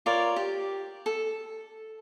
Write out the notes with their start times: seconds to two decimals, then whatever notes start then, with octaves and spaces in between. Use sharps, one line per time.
0.06 F4 A#4 C#5 D5
0.36 G4
1.06 A4